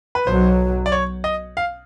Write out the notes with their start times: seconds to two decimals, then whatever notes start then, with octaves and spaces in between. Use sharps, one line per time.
0.15 B4
0.27 B1 B2 F#3 C5
0.86 D5
0.92 C#5
1.24 D#5
1.57 F5